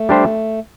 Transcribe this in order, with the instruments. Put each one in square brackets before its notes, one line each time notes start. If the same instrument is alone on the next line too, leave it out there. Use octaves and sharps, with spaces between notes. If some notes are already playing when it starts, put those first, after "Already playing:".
Already playing: [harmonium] A3
[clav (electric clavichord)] G3 D4 G4 C5